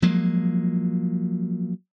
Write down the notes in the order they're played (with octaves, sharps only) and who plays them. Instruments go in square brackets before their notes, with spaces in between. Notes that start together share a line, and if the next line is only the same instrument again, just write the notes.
[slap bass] F3 F#3 G#3 A#3